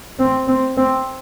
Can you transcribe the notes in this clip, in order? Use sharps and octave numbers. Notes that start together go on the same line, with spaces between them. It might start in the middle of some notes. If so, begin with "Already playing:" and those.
C4
C4
C4